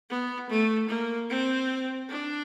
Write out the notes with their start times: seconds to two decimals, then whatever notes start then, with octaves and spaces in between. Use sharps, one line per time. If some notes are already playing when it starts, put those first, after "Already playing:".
0.10 B3
0.50 A3
0.89 A#3
1.30 C4
2.09 D4